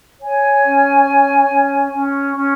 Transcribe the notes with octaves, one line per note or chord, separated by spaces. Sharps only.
C#5 G#5
C#4
C#5
C#4
C#4
C#4